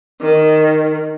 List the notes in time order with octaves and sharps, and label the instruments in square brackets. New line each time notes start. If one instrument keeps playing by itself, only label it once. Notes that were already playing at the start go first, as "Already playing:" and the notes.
[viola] D#3